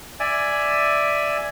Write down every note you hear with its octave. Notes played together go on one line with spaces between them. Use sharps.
D5 E5 G#5